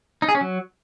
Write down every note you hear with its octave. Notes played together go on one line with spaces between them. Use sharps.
D#4
G#4
C#4
F#3